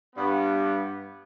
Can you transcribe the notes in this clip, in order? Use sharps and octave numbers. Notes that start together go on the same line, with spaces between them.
G2 G3 B3